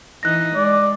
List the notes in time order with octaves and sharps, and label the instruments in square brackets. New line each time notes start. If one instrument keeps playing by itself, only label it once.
[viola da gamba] E3 D#4 [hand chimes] F#6 A#6
[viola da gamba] G#3 [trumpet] D5